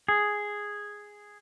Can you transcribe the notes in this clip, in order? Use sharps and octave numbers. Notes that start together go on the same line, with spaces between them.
G#4